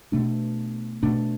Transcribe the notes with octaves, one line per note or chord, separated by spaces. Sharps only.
B2 A3 D4
B2 A3 D4